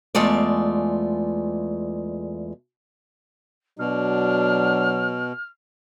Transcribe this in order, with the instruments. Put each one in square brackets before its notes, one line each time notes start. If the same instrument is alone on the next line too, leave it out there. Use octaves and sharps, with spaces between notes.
[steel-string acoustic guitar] E2 G#3 A3 F4 D5
[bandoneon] B2 [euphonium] F#3 [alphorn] D4 [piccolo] F6